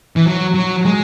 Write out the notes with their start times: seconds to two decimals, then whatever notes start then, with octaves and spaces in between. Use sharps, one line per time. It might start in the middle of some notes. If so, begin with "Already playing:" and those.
0.16 E3
0.25 F#3
0.54 F#3
0.85 G#3